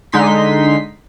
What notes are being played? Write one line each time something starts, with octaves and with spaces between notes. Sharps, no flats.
D3 G#3 D#4 C6 B6